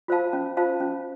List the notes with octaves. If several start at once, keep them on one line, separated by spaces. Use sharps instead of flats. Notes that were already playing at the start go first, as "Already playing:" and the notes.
F4 C5 F5 A5
C#4
F4 C5 F5 A5
C#4